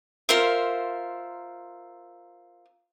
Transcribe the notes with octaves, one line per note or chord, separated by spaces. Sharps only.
F4 A#4 C5 E5